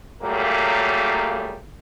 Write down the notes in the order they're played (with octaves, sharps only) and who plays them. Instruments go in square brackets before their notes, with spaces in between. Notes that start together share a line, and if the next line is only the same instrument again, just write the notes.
[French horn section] A#2 C#3 F#3 G3 A3 A#3